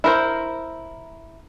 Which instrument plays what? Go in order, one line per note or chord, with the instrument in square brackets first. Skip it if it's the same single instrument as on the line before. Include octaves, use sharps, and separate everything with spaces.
[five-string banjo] E4 A#4 C5